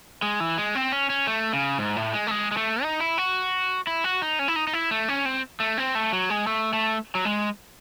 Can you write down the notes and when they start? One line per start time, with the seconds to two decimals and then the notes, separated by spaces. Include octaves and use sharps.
0.22 G#3
0.40 E3
0.58 G#3
0.75 C4
0.92 C#4
1.10 C#4
1.27 A3
1.53 C#3
1.78 G#2
1.96 A2
2.13 G#3
2.27 A3
2.31 G#3
2.51 G#3
2.57 A3
2.83 D#4
3.00 E4
3.18 F#4
3.87 E4
4.04 F#4
4.22 D#4
4.39 C#4
4.48 E4
4.56 D#4
4.67 D#4
4.73 E4
4.91 A3
5.09 C#4
5.26 C4
5.60 A3
5.78 C4
5.95 A3
6.13 F#3
6.30 G#3
6.47 A3
6.73 A3
7.15 F#3
7.25 G#3